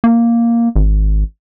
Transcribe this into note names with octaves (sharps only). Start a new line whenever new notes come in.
A#3
G#1